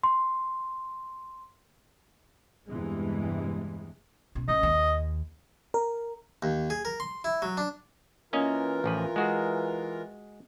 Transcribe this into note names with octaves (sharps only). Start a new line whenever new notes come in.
C6
E2 G2 C3 E3 G#3
A1 B2
A1 D#5
D#2
A#4
D#2
G#4
A#4
C6
E4
F#3
D4
E3 A#3 C#4 F4 A#4 D#5
A1 F3 B4
G#3 F#4 G#4